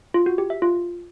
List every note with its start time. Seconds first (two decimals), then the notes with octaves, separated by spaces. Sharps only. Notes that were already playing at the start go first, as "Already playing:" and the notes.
0.14 F4
0.26 F#4
0.38 G4
0.50 E5
0.62 F4